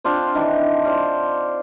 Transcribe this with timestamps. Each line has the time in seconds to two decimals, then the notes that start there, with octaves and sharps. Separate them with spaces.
0.04 C4 D4 F4 C5
0.34 D#3 E3 D4
0.85 F4 C5 D5 F5